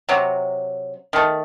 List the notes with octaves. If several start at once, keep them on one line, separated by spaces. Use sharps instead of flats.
C3 F#3
D#3 A3